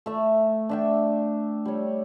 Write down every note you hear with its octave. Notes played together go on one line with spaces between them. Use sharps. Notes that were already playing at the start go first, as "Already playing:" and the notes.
A3 E5
D4 E5 G5
G3 C#5